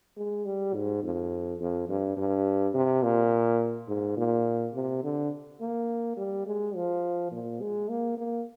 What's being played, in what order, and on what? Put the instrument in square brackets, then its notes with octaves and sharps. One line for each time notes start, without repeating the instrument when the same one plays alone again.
[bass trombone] G#3
G3
G#2
F2
F2
G2
G2
C3
A#2
G#2
A#2
C3
D3
A#3
G3
G#3
F3
A#2
G#3
A#3
A#3